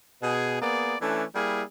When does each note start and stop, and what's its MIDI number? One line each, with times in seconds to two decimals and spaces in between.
0.22 0.58 47
0.22 0.58 68
0.61 0.95 58
0.61 0.95 59
0.61 0.95 68
0.61 0.95 74
1.01 1.24 52
1.01 1.24 57
1.01 1.24 61
1.01 1.24 62
1.35 1.62 55
1.35 1.62 58
1.35 1.62 64
1.35 1.62 68